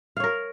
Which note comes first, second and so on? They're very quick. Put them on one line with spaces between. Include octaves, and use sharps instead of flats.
F5 C#5 A#4